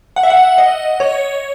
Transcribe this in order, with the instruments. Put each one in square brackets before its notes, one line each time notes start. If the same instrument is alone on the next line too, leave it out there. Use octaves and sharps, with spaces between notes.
[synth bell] F#5
E5
F#5
D#5
C#5